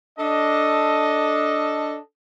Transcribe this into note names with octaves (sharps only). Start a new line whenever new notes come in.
D4 A4 D#5